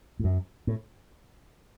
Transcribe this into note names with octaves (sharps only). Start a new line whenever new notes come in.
A2
F#2
A2